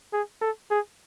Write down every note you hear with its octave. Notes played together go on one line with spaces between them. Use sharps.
G#4
A4
G#4